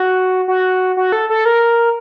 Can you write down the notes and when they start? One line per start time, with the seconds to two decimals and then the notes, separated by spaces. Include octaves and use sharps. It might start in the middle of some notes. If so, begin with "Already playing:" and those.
Already playing: F#4
0.48 F#4
0.97 F#4
1.12 A4
1.29 A4
1.45 A#4